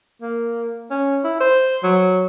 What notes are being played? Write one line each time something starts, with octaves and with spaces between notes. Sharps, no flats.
A#3
C#4
E4
C5
F#3